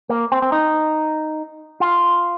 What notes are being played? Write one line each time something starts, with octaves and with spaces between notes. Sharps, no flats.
A#3
C4
C4
D#4
F4